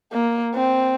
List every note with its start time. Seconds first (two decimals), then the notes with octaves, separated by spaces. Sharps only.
0.12 A#3
0.55 C4